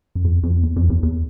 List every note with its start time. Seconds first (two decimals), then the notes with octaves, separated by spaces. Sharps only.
0.15 F#2
0.25 F2
0.43 F2
0.63 E2
0.76 F2
0.90 E2
1.03 E2